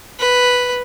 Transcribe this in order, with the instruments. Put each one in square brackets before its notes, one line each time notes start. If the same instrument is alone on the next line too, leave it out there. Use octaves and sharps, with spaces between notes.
[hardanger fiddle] B4